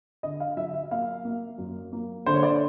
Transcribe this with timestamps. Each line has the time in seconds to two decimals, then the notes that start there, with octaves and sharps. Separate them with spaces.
0.23 D3 D#5
0.40 F5
0.57 F#3 E5
0.74 E5
0.91 A#3 F5
1.25 A#3
1.58 F#2
1.93 A#3
2.26 D3 C5
2.35 C#5
2.43 D5